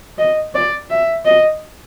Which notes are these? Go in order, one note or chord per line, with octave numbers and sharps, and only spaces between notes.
D#5
D5
E5
D#5